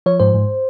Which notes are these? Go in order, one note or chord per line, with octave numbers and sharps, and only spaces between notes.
F3 C#5
G#2 C5
G#2